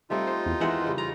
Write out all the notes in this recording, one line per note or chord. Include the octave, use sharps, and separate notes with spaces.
G3 A3 C4 D#4 F4
C5
E2
D#3 E3 G#3 C5 E5 F#5
C#3 G3
F4 A#5